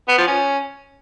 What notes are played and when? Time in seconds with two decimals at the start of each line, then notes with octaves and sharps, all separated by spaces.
0.09 B3
0.18 F3
0.27 C#4